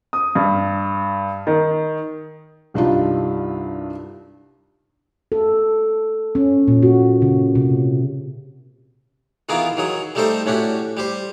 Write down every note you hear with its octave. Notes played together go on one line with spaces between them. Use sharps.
D#6
G2
D#3
C2 G2 D4 D#4 F4
A4
C#4
A#2
F#4
C#3
C3
D#3 E3 B3 F4 G#4 A#4
D#3 F#3 G#4
G3 A3 D#4 A4 C5 G5
A2 C#4 D4 F#4 G4
G3 G4 C5